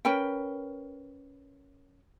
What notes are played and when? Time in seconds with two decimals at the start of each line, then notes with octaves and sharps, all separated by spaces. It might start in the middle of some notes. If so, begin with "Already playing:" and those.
0.05 C#4 A#4 B4 G5